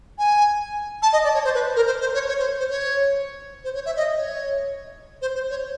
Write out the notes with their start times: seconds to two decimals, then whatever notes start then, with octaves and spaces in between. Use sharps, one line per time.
0.18 G#5
1.02 A5
1.13 D#5
1.24 D5
1.34 C#5
1.44 C5
1.55 B4
1.76 A#4
1.86 C5
2.00 C5
2.14 C#5
2.28 C#5
2.39 C5
2.59 C5
2.70 C#5
3.64 C5
3.75 C#5
3.86 E5
3.97 D#5
4.17 C#5
5.22 C5
5.35 C5
5.50 C#5